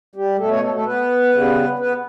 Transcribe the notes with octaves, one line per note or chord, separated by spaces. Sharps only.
G3 G4
B2 A3 A4
C#4 C#5
A3 A4
A3 A4
B3 B4
C#3 G3 B3
B3 B4